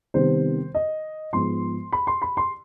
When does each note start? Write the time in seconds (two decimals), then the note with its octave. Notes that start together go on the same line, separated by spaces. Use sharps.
0.14 C3 D#3 G3 B3 C5
0.75 D#5
1.33 G#2 F3 B3 C6
1.92 B5
2.07 C6
2.22 B5
2.37 C6